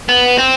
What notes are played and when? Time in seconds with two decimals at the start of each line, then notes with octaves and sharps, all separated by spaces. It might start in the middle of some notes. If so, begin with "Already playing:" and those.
0.09 B3
0.38 C4